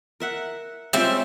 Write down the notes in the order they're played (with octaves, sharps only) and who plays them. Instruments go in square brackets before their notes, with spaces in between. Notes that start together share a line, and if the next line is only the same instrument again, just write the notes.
[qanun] A#4 E5 F#5
[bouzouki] G3 C4 E5 [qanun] G#3 C#4 F4